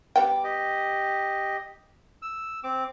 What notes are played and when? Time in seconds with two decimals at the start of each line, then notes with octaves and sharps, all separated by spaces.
0.16 G3 B3 G5 D6
0.44 G4 D#5
2.22 E6
2.64 C4 D6